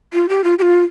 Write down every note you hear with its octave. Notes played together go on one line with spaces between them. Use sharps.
F4
G4
F4
G4
F4